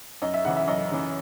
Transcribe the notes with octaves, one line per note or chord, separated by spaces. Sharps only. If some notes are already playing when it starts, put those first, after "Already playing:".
F#2 D#5
E5
C#3 E3 F#5
E5
F#2 D#5
C#3 E3